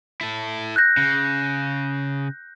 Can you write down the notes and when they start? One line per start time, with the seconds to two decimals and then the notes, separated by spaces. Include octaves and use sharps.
0.21 E4 A4
0.76 F#6 G6 A#6
0.97 C#3